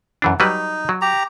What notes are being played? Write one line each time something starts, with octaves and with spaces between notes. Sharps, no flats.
F#2 E3 D4
F#3 G3 D#4 B4
F#3
G4 A#5